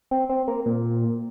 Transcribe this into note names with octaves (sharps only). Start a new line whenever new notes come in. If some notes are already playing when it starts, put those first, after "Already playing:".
C4
C4
A#3
A#2